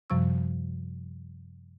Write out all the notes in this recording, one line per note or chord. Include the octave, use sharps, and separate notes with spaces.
F#2 C3 F3 G3 C#6 E6